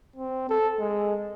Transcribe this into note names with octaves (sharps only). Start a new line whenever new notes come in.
C4
A4
G#3